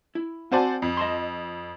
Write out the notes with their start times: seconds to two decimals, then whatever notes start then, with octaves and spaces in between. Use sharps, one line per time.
0.15 E4
0.52 C4 F#4 C5 D5 G#5 A5
0.82 F2
0.97 D#5 A5 C6